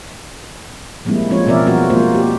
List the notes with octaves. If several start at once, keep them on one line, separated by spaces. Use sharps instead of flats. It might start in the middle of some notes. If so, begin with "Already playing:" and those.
F3 G3 G#3 A#3 C4 E4
F3 G#3 C4 C#4 F4 C#5
B2 F3 C4 A#4 D5 E5
F3 G3 B3 F4 F#4 A#4
F3 G#3 A#3 F4 C5
G4